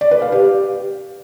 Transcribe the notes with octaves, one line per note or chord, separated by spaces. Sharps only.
D5
B4
F5
G4